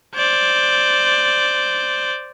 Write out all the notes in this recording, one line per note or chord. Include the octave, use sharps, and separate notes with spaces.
C5 D5